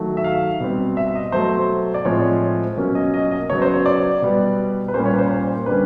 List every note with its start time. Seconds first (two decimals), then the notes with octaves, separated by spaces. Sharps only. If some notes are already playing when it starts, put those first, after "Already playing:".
Already playing: D#3 F#3 A3
0.17 E5
0.24 F5
0.60 B2 G3 C4
0.97 E5
1.15 D#5
1.32 B2 F#3 A3 C5
1.94 D5
2.05 A2 F3 G#3 C4 C#5
2.77 B2 F#3 A#3 C#4
2.95 D#5
3.14 D#5
3.31 D#5
3.50 C#3 F#3 B3 C#5
3.62 C5
3.74 C#5
3.86 D5
4.22 B2 G3 B3
4.88 B4
4.94 A#2 G3 A#3 C#4 C5
5.06 C#5
5.13 B4
5.18 C5
5.31 C5
5.66 D3 G3 A#3 C#4 B4